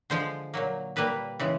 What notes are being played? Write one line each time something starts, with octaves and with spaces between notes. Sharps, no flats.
D3 F3 G#3 C5
A#2 F#3 A#3
A#2 G3 A#3 B4
C#3 E3 G#3